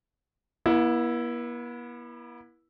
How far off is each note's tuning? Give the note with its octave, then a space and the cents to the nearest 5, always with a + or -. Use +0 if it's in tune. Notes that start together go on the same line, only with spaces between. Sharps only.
B3 -45 E4 +0